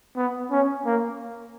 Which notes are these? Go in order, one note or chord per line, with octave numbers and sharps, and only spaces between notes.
B3
C#4
A#3